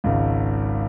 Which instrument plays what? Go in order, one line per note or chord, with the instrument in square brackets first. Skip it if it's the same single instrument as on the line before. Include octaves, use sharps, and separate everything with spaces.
[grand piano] G#1 C#2